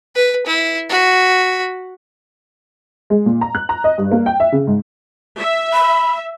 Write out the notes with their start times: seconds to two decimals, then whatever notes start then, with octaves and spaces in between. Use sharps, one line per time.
0.15 B4
0.46 E4
0.89 F#4 B5
3.10 G#3
3.26 A#2
3.41 A#5
3.55 F#6
3.69 A#5
3.84 D#5
3.98 G2
4.11 A#3
4.26 G5
4.40 E5
4.52 C#3
4.67 G#2
5.37 E5
5.73 B5